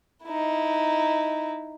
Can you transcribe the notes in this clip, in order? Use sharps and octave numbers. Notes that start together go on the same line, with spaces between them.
D#4 E4